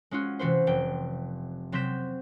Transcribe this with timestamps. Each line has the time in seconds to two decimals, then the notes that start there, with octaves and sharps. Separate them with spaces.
0.11 G#3 C#4 F4 F#4
0.39 C3 E3 F#4 B4 C5
0.67 F1 G5
1.72 C3 F#3 C4 G6 B6 E7